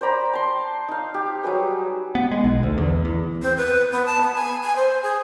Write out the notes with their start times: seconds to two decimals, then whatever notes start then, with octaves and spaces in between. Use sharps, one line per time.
0.01 C5 D5 A#5 B5
0.33 A5 C6
0.88 D#4 F5
1.14 G4
1.43 F#3 G3 G#4 B4
2.15 B3
2.31 G#3
2.44 B1
2.63 D2
2.78 E2
3.05 E2
3.42 C4
3.57 B4
3.92 B3
4.06 A5
4.21 B3
4.35 G#5
4.63 G#5
4.76 C5
5.03 G#4